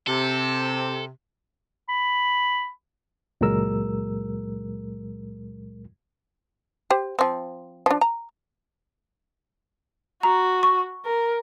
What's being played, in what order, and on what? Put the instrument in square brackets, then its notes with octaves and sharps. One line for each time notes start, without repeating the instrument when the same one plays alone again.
[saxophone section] C3 [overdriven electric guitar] A4
[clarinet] B5
[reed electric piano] C#2 A#2 F#3 G#3 A#4 E6
[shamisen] G4 C5
F3 C4
F3 D4
A#5
[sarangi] F#4 [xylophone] A#5
[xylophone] C#6
[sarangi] A#4